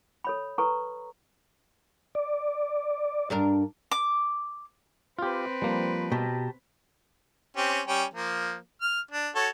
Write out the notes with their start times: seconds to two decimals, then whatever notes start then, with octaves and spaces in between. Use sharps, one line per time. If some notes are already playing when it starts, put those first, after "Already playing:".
0.24 A4 C#5 B5
0.58 A4 B4 A#5 C#6
2.15 D5
3.30 G2 D4 A#4
3.91 D6
5.19 C4 F4 G4 B4
5.62 F3 G3 A#3
6.12 B2 G4 A5 A#5
7.57 C4 C#4 G4
7.88 G3 C#4 G5
8.14 F3 A#3
8.82 F6
9.11 D4
9.36 F#4 A4 C#5